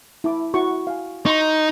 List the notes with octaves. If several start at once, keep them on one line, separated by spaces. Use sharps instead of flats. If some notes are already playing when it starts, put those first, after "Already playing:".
E4 A5 D6
E4 F#4 C#6
F5 G#5
D#4 C6 C#6